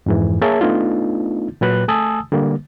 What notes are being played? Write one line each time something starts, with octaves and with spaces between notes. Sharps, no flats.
F2 G#2 E3
A#3 G#4 A#4 C#5 E5 A5
A3 B3 D4 D#4 F4
A#2 F#3 B4 F#6
A3 G#5 A5 D#6 E6
D3 G3 A#3